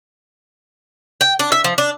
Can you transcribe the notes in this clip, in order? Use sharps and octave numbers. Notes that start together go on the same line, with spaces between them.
G5
D4
E5
F3
D4